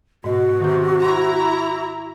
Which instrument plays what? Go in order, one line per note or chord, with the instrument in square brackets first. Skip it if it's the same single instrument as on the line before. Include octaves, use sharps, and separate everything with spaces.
[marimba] G#2 D#5 [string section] B2 [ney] F#4
[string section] C3 [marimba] D#3 G4 G6
[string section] E4 A#5 [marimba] C6